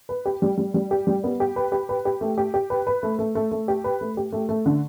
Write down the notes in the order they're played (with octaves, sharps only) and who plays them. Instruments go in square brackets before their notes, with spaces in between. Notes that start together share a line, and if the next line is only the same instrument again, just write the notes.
[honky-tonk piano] B4
G4
G3
G3
G3
G4
G3
B3
G4
B4
G4
B4
G4
A3
G4
G4
B4
B4
A3
A3
A3
A3
G4
B4
A3
G4
A3
A3
D3